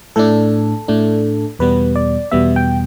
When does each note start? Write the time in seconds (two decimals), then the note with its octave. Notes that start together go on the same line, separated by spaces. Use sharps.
0.16 A2 A3 D4 A4
0.88 A2 A3 D4
1.59 E2 B2 G3 B3 B4
1.96 D5
2.31 E2 B2 G3 B3 E5
2.56 G5